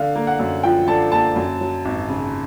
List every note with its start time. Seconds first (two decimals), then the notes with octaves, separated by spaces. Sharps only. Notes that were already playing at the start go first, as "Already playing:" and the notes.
Already playing: D3 F5
0.15 A#3
0.27 F#5
0.39 F#2
0.63 F3 G5
0.87 D3 A5
1.12 A#3 A5
1.36 F#2
1.60 F#3
1.85 G#1
2.09 C#3